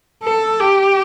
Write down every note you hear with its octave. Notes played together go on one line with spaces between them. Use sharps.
A4
G4